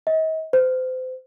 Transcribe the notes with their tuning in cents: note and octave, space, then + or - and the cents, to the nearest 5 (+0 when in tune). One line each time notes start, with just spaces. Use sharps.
D#5 +40
C5 -35